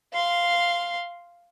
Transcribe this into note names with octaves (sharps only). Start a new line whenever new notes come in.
F5 C6